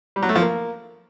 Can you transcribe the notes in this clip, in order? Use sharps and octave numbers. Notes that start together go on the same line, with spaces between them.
G3
F#3
A3
F3
A#3